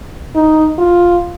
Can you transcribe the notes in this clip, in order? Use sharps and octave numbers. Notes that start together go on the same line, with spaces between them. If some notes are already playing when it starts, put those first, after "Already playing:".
D#4
F4